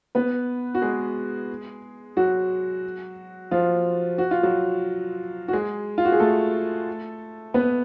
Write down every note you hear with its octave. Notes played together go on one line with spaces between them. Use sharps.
B3 B4
F#4
G#3 G#4
F#3 F#4
F3 F4
F#4
F4
F#3 F#4
F#4
G#3 G#4
F4
F#4
G#4
A3 A4
B3 B4